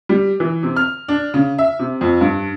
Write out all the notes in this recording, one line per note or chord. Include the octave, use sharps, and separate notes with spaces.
G3
E3
C3
F6
D4
C#3
E5
C3
F2
G2